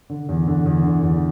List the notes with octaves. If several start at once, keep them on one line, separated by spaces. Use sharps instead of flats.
D3
E2
D3
E2
D3
E2